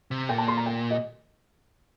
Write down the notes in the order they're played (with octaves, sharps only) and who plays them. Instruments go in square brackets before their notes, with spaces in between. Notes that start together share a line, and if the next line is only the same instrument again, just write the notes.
[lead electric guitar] C3
[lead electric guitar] A#2 [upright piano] G5
[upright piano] A5
C6
A#5
G5
D#5